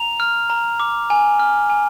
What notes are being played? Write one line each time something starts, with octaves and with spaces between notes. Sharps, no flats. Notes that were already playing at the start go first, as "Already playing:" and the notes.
Already playing: A#5 F7
F6
A#5
D6
G#5
F6
G#5